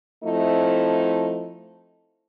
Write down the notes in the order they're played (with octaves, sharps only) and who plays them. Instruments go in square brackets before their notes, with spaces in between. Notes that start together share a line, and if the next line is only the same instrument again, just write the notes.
[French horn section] F3 A3 C4 D#4 E4